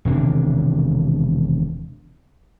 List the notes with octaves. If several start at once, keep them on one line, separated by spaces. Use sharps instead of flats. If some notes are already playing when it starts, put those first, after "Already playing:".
E1 C3 D#3 D4